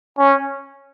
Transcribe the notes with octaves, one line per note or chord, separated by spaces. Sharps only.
C#4